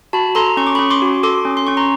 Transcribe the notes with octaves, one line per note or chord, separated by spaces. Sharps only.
F#4 A5 B5
A4 A#5 C6
C#4 C#6
D6
C#4 B5 C#6
C6 D6
F#4
A4 C6 D6
C#4
C6
C#4 C#6
A#5 C6